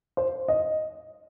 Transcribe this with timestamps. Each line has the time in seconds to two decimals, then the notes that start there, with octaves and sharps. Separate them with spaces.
0.17 C5
0.48 D#5